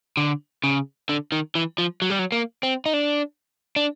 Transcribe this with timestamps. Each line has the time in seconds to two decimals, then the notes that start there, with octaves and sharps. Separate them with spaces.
0.17 D3
0.64 C#3
1.09 D3
1.32 D#3
1.55 E3
1.78 F3
2.02 F#3
2.10 G3
2.19 F#3
2.32 A#3
2.63 C4
2.86 D#4
2.93 D4
3.76 D4